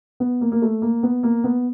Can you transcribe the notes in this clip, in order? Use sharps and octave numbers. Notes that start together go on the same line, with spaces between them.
B3
A#3
A#3
A3
A#3
B3
A#3
B3